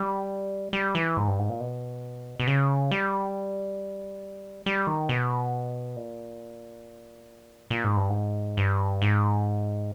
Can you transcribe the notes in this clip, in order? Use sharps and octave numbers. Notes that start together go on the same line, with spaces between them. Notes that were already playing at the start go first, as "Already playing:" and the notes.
Already playing: G3
G3
E3
G#2
G2
G#2
A#2
B2
B2
C#3
G3
G3
D#3
B2
A#2
A#2
G#2
G2
G#2
G2
G#2